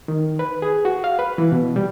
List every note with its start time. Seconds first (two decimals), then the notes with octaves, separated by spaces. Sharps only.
0.08 D#3
0.39 B4
0.62 G#4
0.85 F#4
1.04 F5
1.19 B4
1.38 E3
1.52 B2
1.76 G3